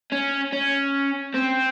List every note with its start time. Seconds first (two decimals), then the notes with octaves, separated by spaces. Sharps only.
0.12 C#4
0.52 C#4
1.34 C4